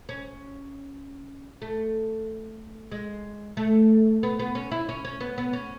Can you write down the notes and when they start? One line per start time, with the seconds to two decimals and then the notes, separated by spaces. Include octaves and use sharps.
0.09 C#4
1.62 A3
2.92 G#3
3.57 A3
4.23 B3
4.39 B3
4.55 C#4
4.72 E4
4.89 C#4
5.05 C#4
5.20 B3
5.38 B3
5.53 C#4